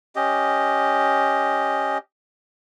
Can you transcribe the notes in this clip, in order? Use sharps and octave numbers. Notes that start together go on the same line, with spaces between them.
C#4 G4 D#5